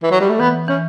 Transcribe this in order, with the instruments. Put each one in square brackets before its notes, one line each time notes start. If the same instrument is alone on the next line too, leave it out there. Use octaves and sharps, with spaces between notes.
[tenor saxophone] E3
F#3
G3
A3
[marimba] E3 [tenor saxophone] B3
[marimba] E3 [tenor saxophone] C#4